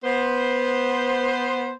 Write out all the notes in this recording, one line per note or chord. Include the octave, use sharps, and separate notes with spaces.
B3 C5